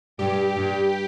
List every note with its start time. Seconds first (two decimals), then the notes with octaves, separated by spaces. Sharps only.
0.19 G2 G4
0.57 G2